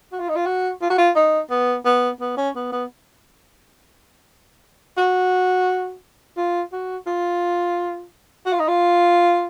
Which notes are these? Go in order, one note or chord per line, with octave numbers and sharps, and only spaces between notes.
F#4
F4
D#4
F4
F#4
F4
F#4
F4
D#4
B3
B3
B3
C#4
B3
B3
F#4
F4
F#4
F4
F#4
F4
D#4
F4